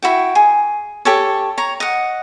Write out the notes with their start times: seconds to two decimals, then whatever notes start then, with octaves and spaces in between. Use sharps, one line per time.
0.03 E4 F#4 G5
0.35 G#4
1.05 G4 A4 C#5
1.57 C#5 A#5
1.80 D#5 F#5